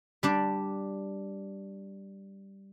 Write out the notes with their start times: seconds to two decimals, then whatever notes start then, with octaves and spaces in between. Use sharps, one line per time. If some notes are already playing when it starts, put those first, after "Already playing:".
0.23 G3 D4 D5